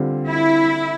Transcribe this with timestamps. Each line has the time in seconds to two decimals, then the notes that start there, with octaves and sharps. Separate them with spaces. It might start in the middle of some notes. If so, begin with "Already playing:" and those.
Already playing: D3 G3 C4 F4
0.28 E4